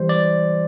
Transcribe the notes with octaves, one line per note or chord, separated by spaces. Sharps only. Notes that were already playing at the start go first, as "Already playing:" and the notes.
Already playing: E3 G3 C5
D5